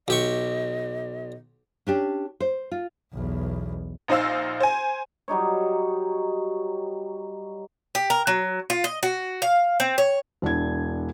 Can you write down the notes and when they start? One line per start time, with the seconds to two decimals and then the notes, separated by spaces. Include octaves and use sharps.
0.08 B1 G4 D#5 C#6
1.87 C#4 D4 G4
2.40 C5
2.71 F4
3.13 B1 E2
4.08 A#1 D#4 C5 F5 E6
4.60 C5 G#5
5.28 F#3 G3 D#4 C#5
7.95 G4
8.10 A#4
8.27 F#3
8.70 F4
8.84 D#5
9.03 F#4
9.42 F5
9.80 C4
9.98 C#5
10.42 E1 D4 E4 G#6